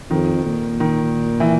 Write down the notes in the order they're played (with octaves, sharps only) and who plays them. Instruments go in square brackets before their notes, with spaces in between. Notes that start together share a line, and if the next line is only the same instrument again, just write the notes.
[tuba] F2 [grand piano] D#3
[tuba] A#2
[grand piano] D#3
E3